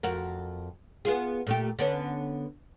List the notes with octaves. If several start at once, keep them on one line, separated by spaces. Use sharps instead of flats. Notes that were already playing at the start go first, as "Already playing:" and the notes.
F2 F#4 A#4
B3 F4 G#4
A#2 A3 G4
D3 B3 C#4